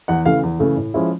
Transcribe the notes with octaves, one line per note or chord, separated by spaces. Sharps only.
E2 F#5
C#3 E3 A3 F5
E2
C#3 E3 A3
A2
F3 G#3 C#4 E4